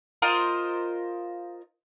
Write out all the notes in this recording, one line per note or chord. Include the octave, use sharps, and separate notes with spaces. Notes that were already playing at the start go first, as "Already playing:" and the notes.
F4 A#4 C5 D#5